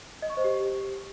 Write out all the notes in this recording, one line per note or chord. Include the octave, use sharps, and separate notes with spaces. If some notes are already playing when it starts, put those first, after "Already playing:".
D#5
C#6
C5
G4